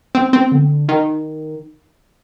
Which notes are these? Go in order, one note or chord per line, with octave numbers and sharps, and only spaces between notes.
C4
C4
D3
D#3